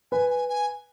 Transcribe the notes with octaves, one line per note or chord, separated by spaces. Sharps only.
B4 G#5
G#5
G#5